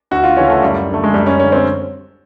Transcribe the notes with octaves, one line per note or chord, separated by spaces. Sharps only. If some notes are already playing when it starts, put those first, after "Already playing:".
D2 F#4
F4
C#3 E3 C#4
A3
F#2 G3
D3
A3
G#3
F#2 G3
C#4
D3 C#4
C4